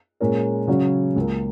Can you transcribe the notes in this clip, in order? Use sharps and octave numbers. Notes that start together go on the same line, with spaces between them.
A#2 G#3 C#4 A#4 C#5
C#3 F#3 C#4 F#4 C#5
C#2 C#3 A#3